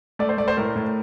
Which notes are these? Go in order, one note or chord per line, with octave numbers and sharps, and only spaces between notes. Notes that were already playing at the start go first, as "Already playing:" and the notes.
A3 D5
C5
A3 D5
C5
A2 A#4
A2